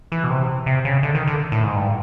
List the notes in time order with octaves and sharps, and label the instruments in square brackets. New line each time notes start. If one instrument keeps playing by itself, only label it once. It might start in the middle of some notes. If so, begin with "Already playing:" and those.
[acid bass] E3
B2
C3
C3
C#3
D3
D#3
D3
A2
G#2
G2